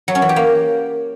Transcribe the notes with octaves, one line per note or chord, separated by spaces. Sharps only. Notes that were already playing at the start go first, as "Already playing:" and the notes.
F#3
C#4
E3
G4
A#3